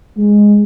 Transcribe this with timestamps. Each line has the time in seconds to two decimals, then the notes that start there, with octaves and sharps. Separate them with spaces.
0.17 G#3